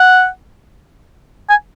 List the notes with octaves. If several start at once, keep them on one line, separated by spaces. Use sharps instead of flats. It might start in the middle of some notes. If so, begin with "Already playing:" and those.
Already playing: F#5
G#5